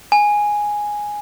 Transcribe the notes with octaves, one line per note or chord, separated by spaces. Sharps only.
G#5